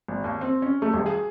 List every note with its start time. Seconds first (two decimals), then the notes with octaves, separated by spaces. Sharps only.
0.08 G#1
0.24 D#2
0.41 C4
0.62 C#4
0.82 A3
0.93 D#1
1.06 G#4